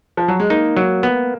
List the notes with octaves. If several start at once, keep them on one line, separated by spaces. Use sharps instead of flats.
F3
F#3
G#3
A#3 D#4
F#3
B3